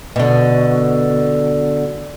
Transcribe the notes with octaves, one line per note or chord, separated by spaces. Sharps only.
B2 D3